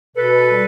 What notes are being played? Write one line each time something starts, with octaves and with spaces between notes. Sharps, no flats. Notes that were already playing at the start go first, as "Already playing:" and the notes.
B2 A4 B4
G3